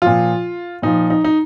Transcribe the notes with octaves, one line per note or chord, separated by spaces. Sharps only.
A#2 F3 F4
A#2 F3 D#4
D#4
D#4